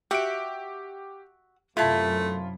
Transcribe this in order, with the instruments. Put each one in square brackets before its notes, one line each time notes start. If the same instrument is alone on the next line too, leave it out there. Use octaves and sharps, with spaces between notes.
[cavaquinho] F#4 E5 [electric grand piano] G4 D7
[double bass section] F#2 C3 [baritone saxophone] A3 [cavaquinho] E4 A5 [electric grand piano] F4